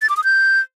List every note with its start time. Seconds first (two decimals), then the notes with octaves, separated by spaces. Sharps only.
0.02 A6
0.09 D6
0.17 D#6
0.24 G6